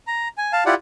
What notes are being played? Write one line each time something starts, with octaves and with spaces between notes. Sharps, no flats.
A#5
G#5
F5 A5
E4 F4 G4 D5 F#5